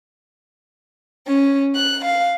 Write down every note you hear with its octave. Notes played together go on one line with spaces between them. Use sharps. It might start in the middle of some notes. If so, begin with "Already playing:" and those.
C#4
F#6
F5